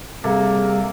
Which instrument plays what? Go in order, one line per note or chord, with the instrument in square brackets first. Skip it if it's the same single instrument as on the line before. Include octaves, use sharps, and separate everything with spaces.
[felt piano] C3 A4 [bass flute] G3 [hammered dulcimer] A#3 [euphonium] G#4